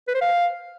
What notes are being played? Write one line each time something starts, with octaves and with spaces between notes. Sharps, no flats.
B4
C5
F5